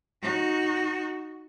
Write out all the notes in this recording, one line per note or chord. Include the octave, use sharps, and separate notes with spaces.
D#4 F#4